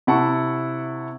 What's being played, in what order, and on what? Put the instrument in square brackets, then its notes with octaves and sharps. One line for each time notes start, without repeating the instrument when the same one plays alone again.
[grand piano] C3 E4 F#5 A5 C#6